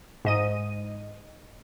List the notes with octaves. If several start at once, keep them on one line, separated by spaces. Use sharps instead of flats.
G#2 D#5 D#7